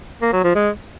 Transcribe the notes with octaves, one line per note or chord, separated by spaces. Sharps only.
A#3
F#3
F3
G#3